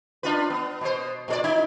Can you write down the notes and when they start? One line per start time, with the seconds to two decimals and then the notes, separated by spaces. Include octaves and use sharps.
0.23 D4 F4 B4
0.50 B3
0.81 B2 C5
1.28 A#2 A4 D5
1.44 D#4 E4